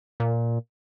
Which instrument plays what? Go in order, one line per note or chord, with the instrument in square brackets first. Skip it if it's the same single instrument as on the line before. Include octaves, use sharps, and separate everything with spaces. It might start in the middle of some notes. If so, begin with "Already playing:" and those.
[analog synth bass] A#2